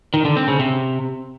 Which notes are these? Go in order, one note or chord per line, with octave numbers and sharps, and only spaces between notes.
D#3
D3
C4
C#3
C3